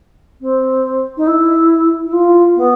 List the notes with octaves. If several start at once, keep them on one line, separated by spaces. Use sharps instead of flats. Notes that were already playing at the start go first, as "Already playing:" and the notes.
C4
D#4
E4
E4
F4
B3